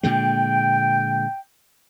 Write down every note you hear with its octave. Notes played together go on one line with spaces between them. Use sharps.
A#2 D3 G#3 G5